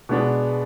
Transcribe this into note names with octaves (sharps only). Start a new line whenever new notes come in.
B2 G#3 B3 D4